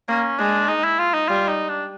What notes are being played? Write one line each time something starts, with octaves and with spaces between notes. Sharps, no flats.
A#3 C#4
G#3 D4
D#4
E4
F4
D#4
G3 F4
D#4
D4